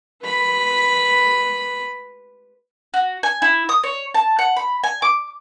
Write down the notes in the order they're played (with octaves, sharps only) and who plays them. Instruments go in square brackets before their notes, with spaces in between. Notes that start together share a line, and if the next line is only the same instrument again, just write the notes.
[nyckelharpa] B4 B5
[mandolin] F#4
G#5
E4
D#6
C#5
A5
F#5
B5
G#5
D6